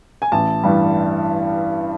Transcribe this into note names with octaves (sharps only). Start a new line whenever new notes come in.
G#5
A1 A5
G2 E3 G3